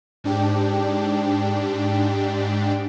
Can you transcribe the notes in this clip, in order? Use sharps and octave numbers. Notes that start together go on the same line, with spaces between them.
G#2 D4 G4